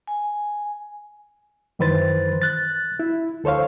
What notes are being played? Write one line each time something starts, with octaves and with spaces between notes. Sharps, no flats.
G#5
F#2 D#3 E3 B4 C5 A6
F#6 A6
E4
D2 A4 C5 C#5 F5